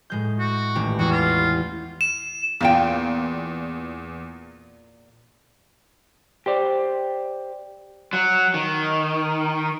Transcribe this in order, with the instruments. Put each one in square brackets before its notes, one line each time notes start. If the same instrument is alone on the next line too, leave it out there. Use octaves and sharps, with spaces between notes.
[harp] A2 G#3 G6
[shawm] F#4
[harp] D#1 A1 G4
[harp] E2 E4 [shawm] F#4
[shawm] F4
[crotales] E7
[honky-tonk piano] E2 [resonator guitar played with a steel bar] A#2 F4 G5
[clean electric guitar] G4 C5 D5
[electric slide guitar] F#3
D#3